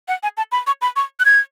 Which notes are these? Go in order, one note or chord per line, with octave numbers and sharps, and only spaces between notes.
F#5
G#5
A5
B5
C#6
B5
C#6
F#6
G#6